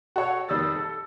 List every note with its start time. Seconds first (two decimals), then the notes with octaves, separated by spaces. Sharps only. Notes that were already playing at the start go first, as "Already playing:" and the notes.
0.16 F#4 A4 C#5
0.49 F1 D#3 G3 D#6 E6 A6
0.76 A4